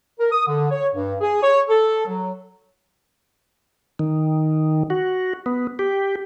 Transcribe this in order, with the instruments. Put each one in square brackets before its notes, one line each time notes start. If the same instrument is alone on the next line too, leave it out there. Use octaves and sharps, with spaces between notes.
[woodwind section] A#4
D#6
D3
C#5
G2
G#4
C#5
A4
F#3
[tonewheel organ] D#3
F#4
B3
G4